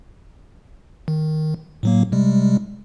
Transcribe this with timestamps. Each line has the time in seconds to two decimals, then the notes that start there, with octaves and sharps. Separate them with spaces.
1.08 D#3
1.83 A2 F#3 A#3
2.12 C3 G3 G#3